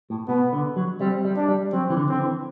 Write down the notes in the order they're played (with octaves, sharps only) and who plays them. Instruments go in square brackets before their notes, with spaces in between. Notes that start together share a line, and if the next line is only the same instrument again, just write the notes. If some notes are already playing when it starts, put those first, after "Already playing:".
[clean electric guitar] A2
[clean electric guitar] B2 [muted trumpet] B3
[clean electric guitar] D3
F#3
[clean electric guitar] G3 [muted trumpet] C4
[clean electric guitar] G3
[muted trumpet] D4
[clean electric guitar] G3
[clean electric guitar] F#3 [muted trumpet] C4
[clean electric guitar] E3
D3
[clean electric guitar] D3 [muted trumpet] C4
[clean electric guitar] E3